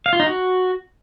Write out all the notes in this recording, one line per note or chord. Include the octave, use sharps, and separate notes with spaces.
F5
F4
D#4
F#4